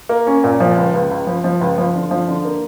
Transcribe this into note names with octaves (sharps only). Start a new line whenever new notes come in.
A#3
C#4
A#2
F3
C#2
C#2
C#2
F3
F3
C#2
F3
D3
F3
D3
A#3